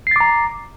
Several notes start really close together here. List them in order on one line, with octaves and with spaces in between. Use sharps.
C7 A6 D6 A#5